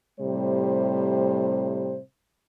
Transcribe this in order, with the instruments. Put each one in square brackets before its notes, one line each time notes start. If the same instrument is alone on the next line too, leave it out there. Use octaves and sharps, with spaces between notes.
[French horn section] A2 C3 G3 C5